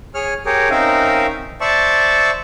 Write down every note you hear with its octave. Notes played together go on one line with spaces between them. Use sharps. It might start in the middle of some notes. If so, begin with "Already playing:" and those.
G#4 C#5 F6
G4 G#4 A#4 C#5
C4 C#4 D#4 A#4 E5 F5
C5 D5 E5 A5 C#6